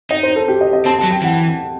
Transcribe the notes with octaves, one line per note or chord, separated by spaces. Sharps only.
D#4 D#5
C5
A4
G4
D#5
D#5
C4 A5
A5
F#3
G5
E3 F#5